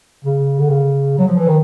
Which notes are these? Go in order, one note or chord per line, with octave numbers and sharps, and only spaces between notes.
C#3
D3
C#3
F#3
F3
E3
D#3